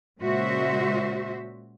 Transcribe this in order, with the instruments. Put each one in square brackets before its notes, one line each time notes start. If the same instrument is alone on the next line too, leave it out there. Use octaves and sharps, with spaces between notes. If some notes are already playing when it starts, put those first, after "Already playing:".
[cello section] A#2 C#3 G#3 F#4 C5 E5